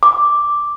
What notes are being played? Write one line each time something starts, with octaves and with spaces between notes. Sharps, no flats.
D6